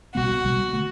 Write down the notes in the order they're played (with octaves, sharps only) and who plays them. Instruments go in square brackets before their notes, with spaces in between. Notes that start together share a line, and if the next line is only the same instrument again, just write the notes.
[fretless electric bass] C2 B2 G3 B3 [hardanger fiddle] F#4
[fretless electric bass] C2 B2 G3 B3
D3 A3